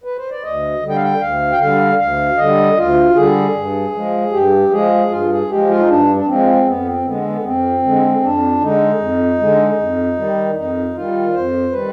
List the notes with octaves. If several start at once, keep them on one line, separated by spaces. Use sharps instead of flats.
B4
C5
D5
D2 D#5
D3 G3
G5
F5
G5
D2 F5
G5
D3 G3 F5
D2 F5
D3 G3 D#5
D2 F4
D3 G3 G#4
G2
F3 G#3
G2 G4
F3 G#3 G#4
G2 F4
G#4
F3 G#3 G4
F4
D#4
G2 D4
D4
F3 G#3 C4
F2 B3
C4
D3 G#3 B3
B3
F2 C4
D3 G#3
F2 D4
D3 G#3 D#4
F2
D3 G#3
F2
D#3 G3
F2 D#4
D#3 G3 F4
F2 C5
D#3 G3 B4